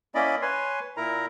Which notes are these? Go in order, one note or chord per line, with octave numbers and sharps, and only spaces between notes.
A#3 C#4 E4 D5 D#5 B5
B4 C#5 G#5 C6
A#2 E4 A#4 A#5